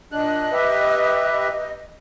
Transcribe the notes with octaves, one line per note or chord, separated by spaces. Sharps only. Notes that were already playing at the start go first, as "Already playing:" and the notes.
A#2 D4 D#5 F#6
G4 B4 E5